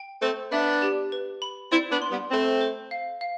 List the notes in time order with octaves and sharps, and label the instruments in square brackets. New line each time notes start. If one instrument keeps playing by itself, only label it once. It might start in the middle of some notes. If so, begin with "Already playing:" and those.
Already playing: [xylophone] G5
[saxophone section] A3 C4 [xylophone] C5
[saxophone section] B3 D4 [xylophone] E5
[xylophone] G4
B4
B5
[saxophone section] C4 E4 [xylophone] D5
[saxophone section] B3 D4
[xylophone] C6
[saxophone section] G3 B3
[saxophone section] A3 C4 [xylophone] B5
[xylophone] C5
F5
F5